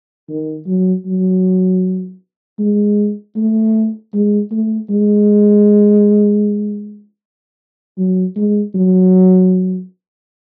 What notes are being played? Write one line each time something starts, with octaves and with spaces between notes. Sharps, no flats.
D#3
F#3
F#3
G#3
A3
G#3
A3
G#3
F#3
G#3
F#3